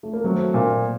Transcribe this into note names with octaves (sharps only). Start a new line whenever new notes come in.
A3
A#3
F#3 A3 C4
A#2